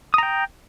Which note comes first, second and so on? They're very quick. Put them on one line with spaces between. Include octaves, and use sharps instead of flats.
D#6 A#5 G5